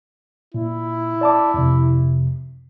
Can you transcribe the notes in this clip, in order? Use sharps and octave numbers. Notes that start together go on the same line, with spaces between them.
A#2 E4
D5 A5 D6
F2 C3